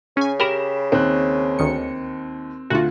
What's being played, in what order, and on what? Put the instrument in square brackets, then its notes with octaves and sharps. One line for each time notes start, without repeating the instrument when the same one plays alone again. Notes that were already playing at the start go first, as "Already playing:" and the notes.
[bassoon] C#3 [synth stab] C#4 G#5
[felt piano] G4 B5 E7 [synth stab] A#4
[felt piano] D#2 [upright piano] C4 F#6
[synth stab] D2 D#3 C#7
[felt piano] D2 F4 [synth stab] F#4